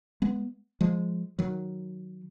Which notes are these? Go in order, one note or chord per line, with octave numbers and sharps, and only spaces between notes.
G#3 B3
F3 G#3
D#3 F#3